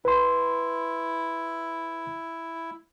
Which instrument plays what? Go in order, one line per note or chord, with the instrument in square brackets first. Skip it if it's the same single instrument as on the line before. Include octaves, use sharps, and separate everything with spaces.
[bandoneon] E4 [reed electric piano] B4 C6